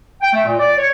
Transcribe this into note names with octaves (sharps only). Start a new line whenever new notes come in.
G5
A3
A#2
D5
C#5